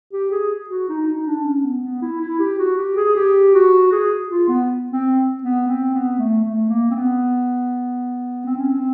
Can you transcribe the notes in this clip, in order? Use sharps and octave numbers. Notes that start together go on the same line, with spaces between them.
G4
G#4
F#4
D#4
D#4
D4
C#4
B3
B3
E4
E4
G4
F#4
G4
G#4
G4
F#4
G#4
F4
B3
C4
B3
C4
B3
A3
A3
A#3
C4
B3
C4
C#4
C4